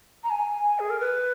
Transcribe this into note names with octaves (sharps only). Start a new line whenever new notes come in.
A#5
G#5
G#4
A#4
B4